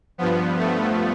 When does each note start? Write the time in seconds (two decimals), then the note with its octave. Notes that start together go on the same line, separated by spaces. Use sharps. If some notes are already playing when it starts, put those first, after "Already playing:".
0.18 G2 F3 B3
0.57 A3